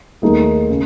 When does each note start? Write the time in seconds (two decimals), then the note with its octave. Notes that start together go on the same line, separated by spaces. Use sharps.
0.22 D#2 D#3 A3 D#4 G#4
0.70 C#3